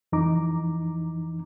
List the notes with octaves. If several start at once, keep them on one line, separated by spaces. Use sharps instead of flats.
F2 E3 D#4 A#5 D6